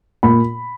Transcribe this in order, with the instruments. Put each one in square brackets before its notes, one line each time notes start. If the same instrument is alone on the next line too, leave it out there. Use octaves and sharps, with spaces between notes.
[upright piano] A#2 B5